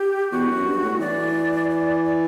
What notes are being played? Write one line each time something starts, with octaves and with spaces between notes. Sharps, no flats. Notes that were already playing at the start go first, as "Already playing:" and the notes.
Already playing: G4
E2 F#4
F#2
G2
A2
E3 D5
D5
D5